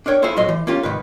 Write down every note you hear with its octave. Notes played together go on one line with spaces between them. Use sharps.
D4 A#4 C#5 G5
E4 F4 G#4 A4 C5
B1 A2 F#3 D#5 C6
E3
A#3 C#4 F4 G4 A#4
C2 G#2 D#3 B4